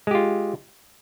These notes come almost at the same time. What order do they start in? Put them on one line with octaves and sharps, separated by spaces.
G#3 G4 F4